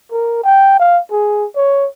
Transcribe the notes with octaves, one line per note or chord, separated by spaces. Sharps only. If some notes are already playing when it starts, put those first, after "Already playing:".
A#4
G5
F5
G#4
C#5